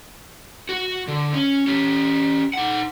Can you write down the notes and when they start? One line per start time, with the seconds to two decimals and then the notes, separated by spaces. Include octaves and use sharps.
0.69 F#4
1.08 D3
1.34 C#4
1.67 C#4 G4
2.53 D#4 F#5